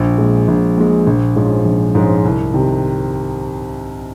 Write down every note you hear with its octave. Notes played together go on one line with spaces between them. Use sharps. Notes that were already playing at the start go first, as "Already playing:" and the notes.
Already playing: A#1
A#2 G#3
A#1
A#2 G#3
A#1
G#2 F3 G#3 C#4
A#1
G#2 F3 G#3 C#4
C2
C3 D#3